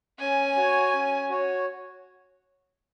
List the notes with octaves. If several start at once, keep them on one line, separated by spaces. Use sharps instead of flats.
C#4 G#5
F#4 C#5
C#4
F#4 C#5